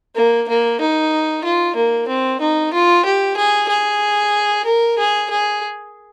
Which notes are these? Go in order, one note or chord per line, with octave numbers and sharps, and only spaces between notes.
A#3
A#3
D#4
F4
A#3
C4
D#4
F4
G4
G#4
G#4
A#4
G#4
G#4